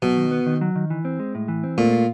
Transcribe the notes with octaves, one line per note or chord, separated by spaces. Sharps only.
B2 F#3
D#3
B3
D#3
F#3
D#3
E3
C4
G#3
A2
E3
C4
A#2 A3
F4